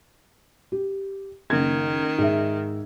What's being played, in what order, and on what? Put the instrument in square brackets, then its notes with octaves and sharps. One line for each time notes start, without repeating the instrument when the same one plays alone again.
[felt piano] G4
[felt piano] F#1 G#6 [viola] D#3
[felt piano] G#2 E5